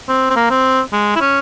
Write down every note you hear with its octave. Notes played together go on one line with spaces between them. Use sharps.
C4
C4
A#3
C4
G#3
E4
C#4